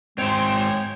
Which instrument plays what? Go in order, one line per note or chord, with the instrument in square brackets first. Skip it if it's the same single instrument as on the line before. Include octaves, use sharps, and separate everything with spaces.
[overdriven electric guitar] G#2 C4 [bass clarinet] G#3 [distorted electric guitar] C#5 C6 [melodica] G5